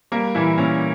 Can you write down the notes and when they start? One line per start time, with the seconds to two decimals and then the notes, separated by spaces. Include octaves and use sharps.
0.12 G3 A#3 A#4
0.35 A#2 E3 E4
0.58 A#2 C#4